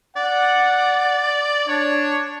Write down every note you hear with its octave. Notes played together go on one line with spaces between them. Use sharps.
D5 F#5
D4 C#5